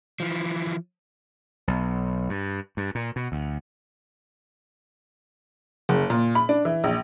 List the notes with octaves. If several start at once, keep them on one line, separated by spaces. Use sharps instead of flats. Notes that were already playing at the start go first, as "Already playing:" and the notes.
E3 F3
B1
G2
G2
A#2
B2
D2
F#1
A#2
B5
D4
E3
A#1